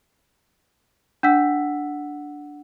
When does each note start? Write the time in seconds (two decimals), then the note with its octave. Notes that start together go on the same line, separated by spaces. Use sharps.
1.23 D4 F#5 E6 B6